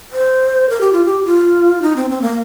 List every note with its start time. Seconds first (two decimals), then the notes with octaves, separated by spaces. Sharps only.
0.12 C5
0.69 A#4
0.81 G4
0.93 F4
1.05 G4
1.25 F4
1.82 D#4
1.96 C4
2.10 C4
2.22 A#3